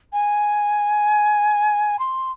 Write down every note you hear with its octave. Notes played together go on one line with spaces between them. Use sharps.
G#5
C6